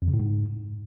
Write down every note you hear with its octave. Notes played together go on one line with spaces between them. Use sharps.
F2
C#3
A2
G#2